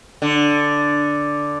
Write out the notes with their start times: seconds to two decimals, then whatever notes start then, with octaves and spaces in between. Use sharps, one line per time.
0.22 D3